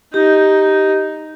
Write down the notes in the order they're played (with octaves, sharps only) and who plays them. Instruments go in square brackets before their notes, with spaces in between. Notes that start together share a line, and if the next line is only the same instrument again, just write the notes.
[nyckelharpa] D#4 [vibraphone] G4